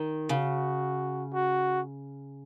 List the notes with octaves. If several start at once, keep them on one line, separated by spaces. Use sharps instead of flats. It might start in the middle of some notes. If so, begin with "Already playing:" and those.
Already playing: D#3
C#3 F#4
F#4